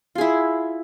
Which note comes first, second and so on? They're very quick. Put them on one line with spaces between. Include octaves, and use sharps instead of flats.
F4 G#4 E4